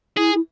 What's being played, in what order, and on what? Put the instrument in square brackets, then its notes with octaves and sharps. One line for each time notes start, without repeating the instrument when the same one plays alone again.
[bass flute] E4 [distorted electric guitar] G#4
[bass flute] E4